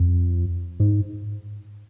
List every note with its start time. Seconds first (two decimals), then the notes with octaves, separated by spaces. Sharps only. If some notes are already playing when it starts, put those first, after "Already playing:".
Already playing: F2
0.80 G#2